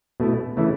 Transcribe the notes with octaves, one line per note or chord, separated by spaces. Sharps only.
B2 A3 E4
C#3 E3 A3 E4